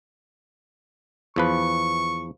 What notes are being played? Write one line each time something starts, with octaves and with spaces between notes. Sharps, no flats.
E2 F3 B4 C#6